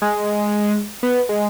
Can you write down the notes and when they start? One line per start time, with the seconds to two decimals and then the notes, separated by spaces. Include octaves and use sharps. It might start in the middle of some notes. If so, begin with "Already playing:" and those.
0.02 G#3
1.03 B3
1.29 G#3